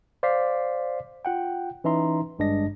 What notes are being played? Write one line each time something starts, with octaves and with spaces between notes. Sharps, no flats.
C5 D5 F5 D6 B6 C7
F4 F#5 G5
E3 C#4 D#4 E5 A#5 C6
G#1 G2 G#3 D4 D#5 A#6